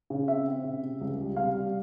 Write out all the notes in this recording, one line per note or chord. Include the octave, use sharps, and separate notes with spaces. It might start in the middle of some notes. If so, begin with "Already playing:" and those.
C#3
C4 E5
C4
C#3
C3
C#2
G3
C3 F5
G3